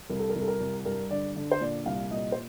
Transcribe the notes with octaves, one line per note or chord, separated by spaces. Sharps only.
C2 A#4
A4
A#4
C2
A4
A#4
C2
G2 A#4
D3 D5
D3
C5
A#2 D5
C2 F5
A#2 D#5
C5